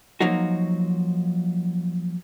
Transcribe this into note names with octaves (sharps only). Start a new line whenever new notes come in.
F3 F#3 A#3 D#4 F#4